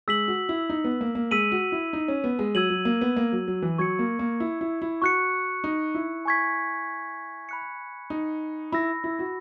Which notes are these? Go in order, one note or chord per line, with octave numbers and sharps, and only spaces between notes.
G#3 E6 B6 F#7
F#4
E4
D#4
B3
A#3
A#3
G#3 E6 B6 D#7 F#7
F#4
E4
D#4
C#4
B3
G#3
F#3 E6 G#6 D#7 F#7
F#3
A#3
B3
A#3
F#3
F#3
E3
F#3 C#6 G#6 C#7
A#3
A#3
E4
E4
E4
F#4 C#6 F#6 C#7
D#4
E4
G#5 C#6 G#6 B6
B5 F#6 C#7
D#4
E4 B5 E6 A#6
E4
F#4